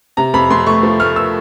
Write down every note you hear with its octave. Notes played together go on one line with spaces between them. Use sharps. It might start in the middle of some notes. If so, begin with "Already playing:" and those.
C3 A#5
F2 B5
F2 C6
A3 C#6
F3
A3 F6
E6